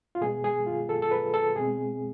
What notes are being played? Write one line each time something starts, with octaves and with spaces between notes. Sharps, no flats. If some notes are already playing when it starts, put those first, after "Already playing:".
F4
B2 G#3 B3 G#4
G#4
F4
A4
A4
B4
A4
B2 G#3 C4 G#4